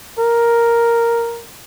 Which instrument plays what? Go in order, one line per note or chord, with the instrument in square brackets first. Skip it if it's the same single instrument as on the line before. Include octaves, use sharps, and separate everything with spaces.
[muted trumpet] A#4